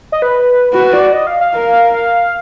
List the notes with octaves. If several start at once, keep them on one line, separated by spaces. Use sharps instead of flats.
D#5
B4
F#4 B4
D5
D#5
F5
F5
A#4
F5